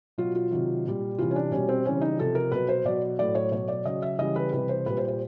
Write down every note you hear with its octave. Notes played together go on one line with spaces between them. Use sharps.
B2 F#3 F4
F4
C3 D#3 F#3
A#2 G3
C3 E3 G3 F4
C#4
D4
B2 G3 C#4
C4
C#3 E3 G3 C#4
D#4
C3 F3 A4
A#4
B2 F#3 B4
C5
B2 F#3 D5
A2 F#3 D5
C#5
B2 F#3 C#5
D5
C#3 F#3 D#5
E5
C#3 E3 G3 D#5
B4
C3 E3 G3 B4
C5
A#2 G3 B4
C5
C5